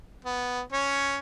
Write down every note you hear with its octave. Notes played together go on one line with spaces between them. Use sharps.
B3
C#4 C#5